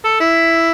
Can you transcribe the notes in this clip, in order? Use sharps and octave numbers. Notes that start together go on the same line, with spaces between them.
A4
E4